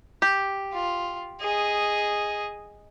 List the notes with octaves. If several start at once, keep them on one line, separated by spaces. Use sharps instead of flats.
G4
F4
G#4 D#5